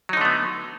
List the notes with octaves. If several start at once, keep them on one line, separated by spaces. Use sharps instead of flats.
D3 F#3 A3 B3 D#4